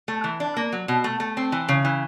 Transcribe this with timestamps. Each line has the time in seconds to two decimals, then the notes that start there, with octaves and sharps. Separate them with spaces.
0.08 A3
0.24 E3
0.40 D4
0.57 A#3
0.73 F#3
0.88 B2
1.04 A3
1.20 A3
1.37 C4
1.52 E3
1.69 C#3
1.85 E3